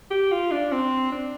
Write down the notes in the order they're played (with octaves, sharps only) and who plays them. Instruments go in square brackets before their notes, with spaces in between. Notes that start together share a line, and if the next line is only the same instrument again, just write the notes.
[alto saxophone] G4
F4
D4
C4
D4